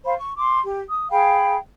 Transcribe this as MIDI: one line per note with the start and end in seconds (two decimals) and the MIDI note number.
0.04 0.13 72
0.04 0.13 77
0.04 0.13 83
0.18 0.31 85
0.38 0.59 84
0.38 0.59 86
0.63 0.79 67
0.88 1.09 87
1.11 1.57 68
1.11 1.57 77
1.11 1.57 79
1.11 1.57 83